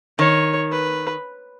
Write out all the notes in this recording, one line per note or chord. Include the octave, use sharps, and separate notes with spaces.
D#3 C#5
B4